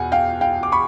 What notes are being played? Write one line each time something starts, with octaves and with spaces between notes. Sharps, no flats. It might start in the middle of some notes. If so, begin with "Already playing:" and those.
Already playing: E2 B2 F#5 G#5
F5 G5
F5 G5
D6
B5 C#6